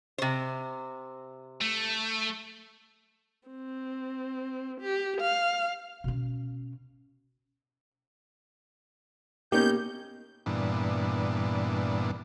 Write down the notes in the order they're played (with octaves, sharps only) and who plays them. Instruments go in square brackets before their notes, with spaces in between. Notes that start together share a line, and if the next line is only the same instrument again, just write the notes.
[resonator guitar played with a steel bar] C3 C5
[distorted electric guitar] A3
[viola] C4
G4
F5
[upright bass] B2 C#4
[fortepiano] B2 C#4 D#4 [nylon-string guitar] A#3 [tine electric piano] G4 [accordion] G6
[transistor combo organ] G2 A#2 E3 B3 D4